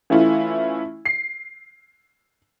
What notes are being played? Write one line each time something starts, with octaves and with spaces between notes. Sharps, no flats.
E3 A3 C#4 E4 F4
C7